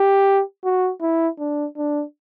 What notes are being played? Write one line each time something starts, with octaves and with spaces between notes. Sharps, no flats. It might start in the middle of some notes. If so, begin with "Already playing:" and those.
Already playing: G4
F#4
E4
D4
D4